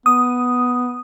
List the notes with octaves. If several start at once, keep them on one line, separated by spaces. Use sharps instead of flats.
B3 D#6